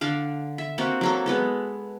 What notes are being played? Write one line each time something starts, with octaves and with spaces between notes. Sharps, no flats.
D3 D4 F5
E5
A#3 C4 F#4 G4
F#3 A#3 A4
G#3 B3 A4